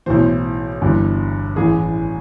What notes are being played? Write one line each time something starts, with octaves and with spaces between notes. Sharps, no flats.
B1 A2 E3 C5
G1 G2 E3
A1 A2 E3 G#4